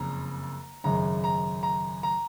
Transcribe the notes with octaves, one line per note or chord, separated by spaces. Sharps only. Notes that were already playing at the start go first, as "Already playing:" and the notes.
Already playing: F#1 F2 C#3 A#5
G#1 F#2 C#3 G#3 A#5
A#5
A#5
A#5